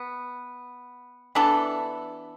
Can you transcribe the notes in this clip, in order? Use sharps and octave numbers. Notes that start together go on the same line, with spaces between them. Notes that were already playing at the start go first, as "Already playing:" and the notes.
Already playing: B3
E3 B3 D4 A4